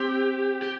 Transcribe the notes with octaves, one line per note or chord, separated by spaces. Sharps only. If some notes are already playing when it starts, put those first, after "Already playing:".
Already playing: C4 G4
G4